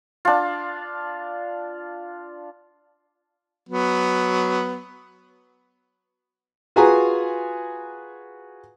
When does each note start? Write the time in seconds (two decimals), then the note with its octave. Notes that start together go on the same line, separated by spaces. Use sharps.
0.25 D4 F4
3.69 F#3 B3
6.76 F4 F#4 G#4 B4 G#5 A#5